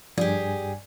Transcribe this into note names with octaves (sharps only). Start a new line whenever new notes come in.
G2 F3 G4 G#4 D5 G#5